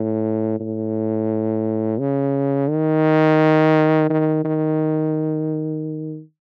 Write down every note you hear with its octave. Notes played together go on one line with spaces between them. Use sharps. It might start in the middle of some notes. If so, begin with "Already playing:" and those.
Already playing: A2
A2
C#3
D#3
D#3
D#3